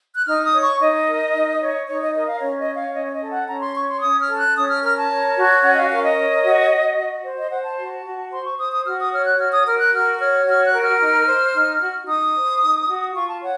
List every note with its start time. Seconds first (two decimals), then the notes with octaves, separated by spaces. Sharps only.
0.14 F#6
0.25 D#4 F6
0.43 D#6
0.53 C#5
0.62 C#6
0.79 D#4 D#5
1.06 A#4
1.33 D#4
1.60 C#5
1.87 D#4 C#5
2.01 D#5
2.14 A#4 D#5
2.27 F5
2.40 C#4 C#5
2.58 D#5
2.68 C#5
2.76 F5
2.94 C#4 D#5
3.12 D#5
3.21 A4
3.30 F#5
3.47 C#4 A#5
3.61 C6
3.74 C#5 C#6
3.88 C6
4.01 C#4 D#6
4.20 F6
4.28 A4
4.37 F#6
4.56 C#4 D#6
4.68 F6
4.82 A#4 F6
4.96 A5
5.09 C#5
5.36 F#4
5.62 C#4 F#5
5.72 D#5
5.76 F5
5.90 A#4 F5
6.03 D#5
6.17 C#5
6.44 F#4
6.70 F#4
6.97 F#4
7.24 C5
7.37 D#5
7.50 C5 F#5
7.64 A5
7.78 F#4
8.05 F#4
8.31 C5 C6
8.45 C#6
8.58 C5 D#6
8.72 D#6
8.85 F#4 F6
8.99 D#6
9.12 C#5 F6
9.25 F#6
9.39 F#4 F6
9.52 D#6
9.66 A#4 F6
9.79 F#6
9.93 F#4 F6
10.19 C#5 F6
10.47 F#4 F6
10.65 F#6
10.73 A#4
10.82 F6
11.01 D#4
11.26 C5
11.54 D#4
11.81 F#4
12.07 D#4 D#6
12.34 C5
12.62 D#4
12.88 F#4
13.15 F4 C#6
13.28 A5
13.41 C#5 F#5